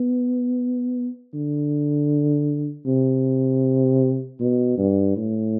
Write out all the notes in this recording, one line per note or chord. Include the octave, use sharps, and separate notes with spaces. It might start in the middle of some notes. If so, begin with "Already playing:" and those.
Already playing: B3
D3
C3
B2
G2
A2